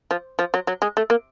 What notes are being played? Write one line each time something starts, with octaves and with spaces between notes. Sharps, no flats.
F3
F3
F#3
F#3
G#3
A3
A#3